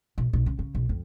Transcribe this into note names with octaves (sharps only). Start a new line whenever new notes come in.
B1
B1
C#3
C#3
B1
F2